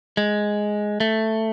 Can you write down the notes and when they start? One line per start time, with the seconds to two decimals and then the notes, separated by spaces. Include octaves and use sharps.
0.17 G#3
1.00 A3